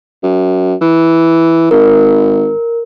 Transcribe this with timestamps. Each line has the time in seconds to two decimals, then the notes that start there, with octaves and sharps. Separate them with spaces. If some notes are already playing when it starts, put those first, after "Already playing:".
0.23 F#2
0.81 E3
1.71 G#1 A#4